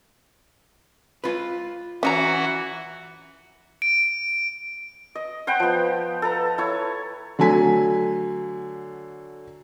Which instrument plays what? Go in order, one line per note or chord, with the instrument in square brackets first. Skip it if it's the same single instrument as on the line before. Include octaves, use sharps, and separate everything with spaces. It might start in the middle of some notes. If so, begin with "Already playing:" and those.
[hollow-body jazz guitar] F4 B4
[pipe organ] E3 F#4 [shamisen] C#4 D#5 A#5
[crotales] D7
[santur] D#5
C5 F#5 G5 B5
F3 B3
A4 B4 A#5
E4 C#5
[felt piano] D3 F#3 A3 G#5 B6